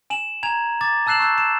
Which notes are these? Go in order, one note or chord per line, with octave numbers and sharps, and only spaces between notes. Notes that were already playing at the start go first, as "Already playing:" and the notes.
G#5 E7 F#7
G#5 A#5 G#6 F7
D6 A6
A5 E6 F#6 C7 E7 F#7
C#6 E6 F#6 G6
E7